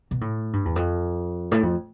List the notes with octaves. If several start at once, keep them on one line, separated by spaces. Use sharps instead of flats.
B2
A2
G2
E2
F2
A2
F2